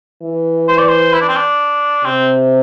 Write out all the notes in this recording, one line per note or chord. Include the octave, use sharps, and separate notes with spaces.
E3
C5
D5
C5
E4
D4
C4
D4
C3 C4